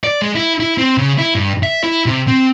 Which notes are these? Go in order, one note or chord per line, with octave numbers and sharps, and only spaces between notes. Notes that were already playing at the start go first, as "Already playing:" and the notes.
D5
G#3
E4
E4
C4
C#3
E4
G2
E5
E4
C3
C4